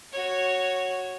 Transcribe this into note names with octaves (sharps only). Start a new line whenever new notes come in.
F#4 C#5